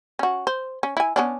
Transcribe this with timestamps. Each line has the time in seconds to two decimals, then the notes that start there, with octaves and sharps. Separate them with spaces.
0.19 C#4 F#4
0.47 C5
0.83 C#4
0.97 E4 G#5
1.16 B3 C#4 D4